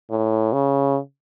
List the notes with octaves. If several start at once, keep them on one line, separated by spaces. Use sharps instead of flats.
A2
C#3